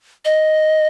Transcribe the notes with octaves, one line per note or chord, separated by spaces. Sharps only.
D#5